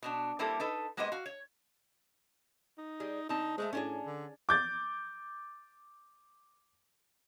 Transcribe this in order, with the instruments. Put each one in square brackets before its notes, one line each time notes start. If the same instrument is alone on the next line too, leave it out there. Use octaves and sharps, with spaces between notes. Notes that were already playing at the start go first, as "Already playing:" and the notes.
[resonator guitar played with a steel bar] B2 B3 D4
G3 A#3 C4 E4 G4 A4
D#4 A4 B4
G#3 A#3 B3 G4 C5 D#5
F#4 F5
C#5
[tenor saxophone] D#4
[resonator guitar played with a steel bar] G3 G#4
[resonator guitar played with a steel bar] D3 C4 A5 [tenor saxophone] D#4
[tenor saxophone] G#3 [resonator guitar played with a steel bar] A3 A4 C5
[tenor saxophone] A2 [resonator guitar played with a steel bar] C#4 D4 G#4
[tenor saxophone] D3
[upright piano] D6 G6 A6